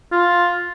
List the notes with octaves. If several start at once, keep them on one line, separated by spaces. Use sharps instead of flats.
F4